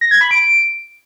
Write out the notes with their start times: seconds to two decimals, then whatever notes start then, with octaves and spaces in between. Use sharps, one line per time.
0.01 A#6
0.11 G#6
0.21 B5
0.31 D7